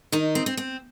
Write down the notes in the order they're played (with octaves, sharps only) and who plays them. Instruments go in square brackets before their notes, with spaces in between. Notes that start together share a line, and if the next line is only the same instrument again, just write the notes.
[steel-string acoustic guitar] D#3 D#4
C4
C4
C4